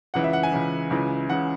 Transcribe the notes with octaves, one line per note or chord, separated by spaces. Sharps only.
C#2 C#3 E3 F#5
E5
F#5
G#5
C#2 C#3 E3
C#2 C#3 E3
C#3 E3 F#5